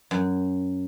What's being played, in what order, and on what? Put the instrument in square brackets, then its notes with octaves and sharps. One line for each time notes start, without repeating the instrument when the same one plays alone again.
[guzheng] F#2